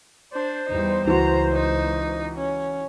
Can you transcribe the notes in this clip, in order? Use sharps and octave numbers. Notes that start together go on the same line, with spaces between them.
D4 C5
E2 G3 D#4
C#2 E3 F#4 A#5
D#4
C#4